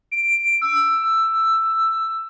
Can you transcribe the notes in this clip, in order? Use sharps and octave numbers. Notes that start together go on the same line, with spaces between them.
D7
E6